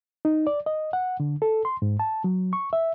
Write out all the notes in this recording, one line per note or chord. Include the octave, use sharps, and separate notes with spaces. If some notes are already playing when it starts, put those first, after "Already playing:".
D#4
D5
D#5
F#5
D3
A4
C6
G#2
A5
F#3
C#6
E5